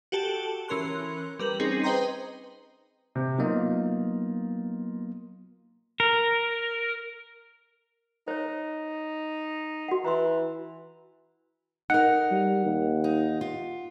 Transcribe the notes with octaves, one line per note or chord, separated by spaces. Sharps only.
F#4 G4 A4 A5
E3 C#4 A#4 C6 F#6
G3 A#4 B4 F#7
C4 C#4 D#4 G#4
B4 C5 D#5 G5 A#5 C6
C3
F#3 A#3 B3 D#4 F4
A#4
D#4 C5 C#5
F#4 F#5
E3 A#5 C6
D#4 A#4 F#5
G3
D#2
D#4
F4